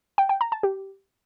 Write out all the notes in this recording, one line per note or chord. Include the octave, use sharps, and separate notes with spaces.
G5
G5
A#5
A5
G4